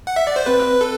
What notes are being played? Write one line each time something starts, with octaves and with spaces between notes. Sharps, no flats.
F#5
E5
D5
C5
C4 B4
A4